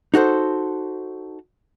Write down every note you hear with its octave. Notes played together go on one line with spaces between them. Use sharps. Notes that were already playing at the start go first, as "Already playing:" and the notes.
D#4 F#4 A4 C5